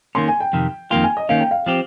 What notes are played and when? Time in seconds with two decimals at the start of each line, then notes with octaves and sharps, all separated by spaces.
0.15 D#3 A#3 C#4 C6
0.28 G#5
0.41 G5
0.53 F2 C3 D#3
0.90 F2 D#3 A#3 F4 G5
1.03 G#5
1.17 D#5
1.29 D#3 A#3 C#4 F5
1.40 G5
1.51 F5
1.66 F3 C4 G4